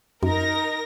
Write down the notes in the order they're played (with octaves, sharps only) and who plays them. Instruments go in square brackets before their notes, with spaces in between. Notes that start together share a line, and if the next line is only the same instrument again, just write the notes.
[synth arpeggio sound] F#2 [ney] D#4 [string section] A#4 A#6